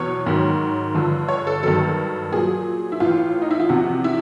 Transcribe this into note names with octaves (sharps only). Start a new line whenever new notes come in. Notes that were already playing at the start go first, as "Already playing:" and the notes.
Already playing: E2 B2 F#3 C#5
G#2 D#3 F#3
G2 D3 F3
C#5
A4
G2 D#3 F#3 A4
A#2 F#3 G#4
E4
A2 E3 F4
D#4
E4
F4
E2 C3 F3 F#4
E4